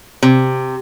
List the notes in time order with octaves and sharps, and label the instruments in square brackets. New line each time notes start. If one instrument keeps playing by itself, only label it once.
[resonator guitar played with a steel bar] C3